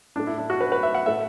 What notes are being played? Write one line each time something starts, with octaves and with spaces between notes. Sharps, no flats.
A2 A3 D4
E4
D4
F#4
B4
B4
E5
F#5
A2 A3 E5